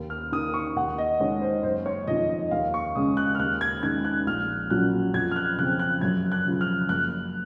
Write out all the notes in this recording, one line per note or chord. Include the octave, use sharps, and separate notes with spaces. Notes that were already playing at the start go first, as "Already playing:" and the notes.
Already playing: D#2
F6
D#3 A#3 D#6
C#6
D#2 F#5
D#5
D#3 G#3 C#5
C5
F#1 C5
C#5
F2 D#3 D#5
D#5
D#2 F5
C#6
C#3 G#3 C#4 D#6
F#6
F6
D#2 F#6
G#6
D#3 G#3 C#4 G#6
F#6
A#1 F6
A#2 F#3 C#4 F#6
F2 G#6
F6
F#6
C#3 F3 C4 F#6
F#6
F#2 G#6
F#6
C#3 F3
F6
F#1 F#6